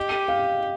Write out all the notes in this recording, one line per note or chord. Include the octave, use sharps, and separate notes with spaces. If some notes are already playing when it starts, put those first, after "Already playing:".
Already playing: G4 D#5
F5